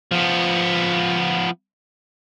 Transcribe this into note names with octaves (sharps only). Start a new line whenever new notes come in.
F3 B3